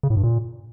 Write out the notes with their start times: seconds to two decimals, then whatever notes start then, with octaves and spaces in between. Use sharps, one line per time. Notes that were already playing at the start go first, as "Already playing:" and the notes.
0.03 C#3
0.10 A2
0.17 G2
0.24 A#2